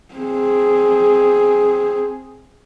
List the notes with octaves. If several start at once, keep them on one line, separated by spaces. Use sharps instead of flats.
C4 G#4